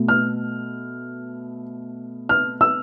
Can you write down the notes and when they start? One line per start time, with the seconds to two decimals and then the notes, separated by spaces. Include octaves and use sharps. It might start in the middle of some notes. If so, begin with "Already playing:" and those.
Already playing: B2 A3
0.08 F6
2.29 F6
2.61 E6